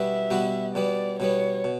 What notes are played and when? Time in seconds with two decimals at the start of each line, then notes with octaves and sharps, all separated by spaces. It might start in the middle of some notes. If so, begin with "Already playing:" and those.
Already playing: B2 G3 B3 F#4 E5
0.30 B2 G3 B3 F#4
0.75 B2 G3 B3 D5
1.20 B2 G3 B3 C#5
1.64 B2